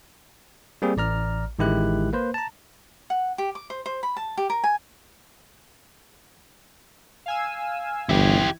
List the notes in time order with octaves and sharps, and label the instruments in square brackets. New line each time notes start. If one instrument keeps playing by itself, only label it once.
[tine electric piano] G3 A#3 C4 G#4
A1 D5 A#5 F6
A1 D#3 G#3 E4 G4 F#6
A#3 B4 C5
A5 A#5
[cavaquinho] F#5
G4
D6
C5
C5
B5
A5
G4
A#4
G#5
[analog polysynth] F5 G#5 E6
[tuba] G1 [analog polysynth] E3 G#6 [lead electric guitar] E4 G4